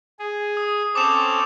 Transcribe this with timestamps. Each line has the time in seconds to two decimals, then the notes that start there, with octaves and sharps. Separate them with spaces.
0.19 G#4
0.57 D#6
0.95 C4 C#4 A4 D6 E7 F7